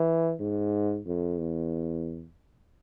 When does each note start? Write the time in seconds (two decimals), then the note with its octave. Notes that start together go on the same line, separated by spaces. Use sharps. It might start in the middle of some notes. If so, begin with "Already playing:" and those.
Already playing: E3
0.40 G#2
1.07 F2
1.39 E2